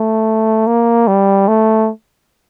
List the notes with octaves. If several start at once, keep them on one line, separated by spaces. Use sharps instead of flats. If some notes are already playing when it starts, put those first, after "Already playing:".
Already playing: A3
A#3
G3
A3